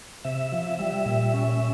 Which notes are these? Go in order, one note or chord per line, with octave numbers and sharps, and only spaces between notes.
C3 E5
F3
G3 E5
A#2
C#4